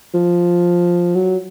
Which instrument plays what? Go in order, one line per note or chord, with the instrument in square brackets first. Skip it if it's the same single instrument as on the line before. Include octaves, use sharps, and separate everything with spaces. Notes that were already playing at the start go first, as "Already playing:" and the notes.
[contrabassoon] F3
F#3